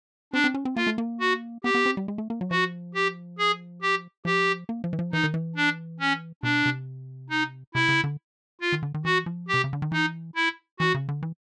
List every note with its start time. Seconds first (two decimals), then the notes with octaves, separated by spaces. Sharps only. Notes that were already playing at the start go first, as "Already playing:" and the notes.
0.33 C4 D4
0.44 C4
0.54 C#4
0.65 C4
0.76 A#3 F4
0.87 A3
0.98 A#3
1.20 F#4
1.64 B3 G4
1.74 B3
1.86 C4
1.97 G3
2.08 G#3
2.18 A3
2.30 A#3
2.41 F#3
2.51 F3 F#4
2.94 G4
3.38 G#4
3.82 G4
4.25 F3 G4
4.69 A#3
4.84 F3
4.93 E3
4.99 F3
5.13 E3 D#4
5.23 D#3
5.34 E3
5.56 D4
6.00 C#4
6.43 B2 D4
6.66 C3
7.30 D#4
7.75 C3 E4
7.89 C#3
8.04 D3
8.61 F4
8.72 D#3
8.83 D3
8.94 D#3
9.05 E3 F#4
9.26 F3
9.48 G4
9.54 C3
9.64 C#3
9.73 D3
9.82 D#3
9.92 E3 D#4
10.36 E4
10.79 E3 F#4
10.94 C#3
11.09 D3
11.22 E3